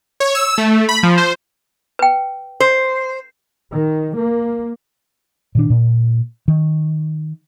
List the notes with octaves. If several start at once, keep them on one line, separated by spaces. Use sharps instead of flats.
C#5
E6
A3
B5
F3
C5
B4 G5
C5
D#3
A#3
A#2 D#3 D4
A#2
D#3